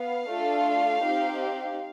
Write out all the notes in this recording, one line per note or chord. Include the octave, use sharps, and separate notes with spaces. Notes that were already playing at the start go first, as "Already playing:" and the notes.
Already playing: B3 F5
A3 D4 F4 A4
C4 D#4 G4